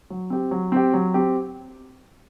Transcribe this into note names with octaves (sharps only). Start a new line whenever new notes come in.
F#3
C4 G4
F#3
C4 G4
F#3
C4 G4